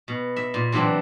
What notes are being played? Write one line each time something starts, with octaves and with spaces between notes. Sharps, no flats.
B2
E5
A#2
C3 E3 F#3 C4 D4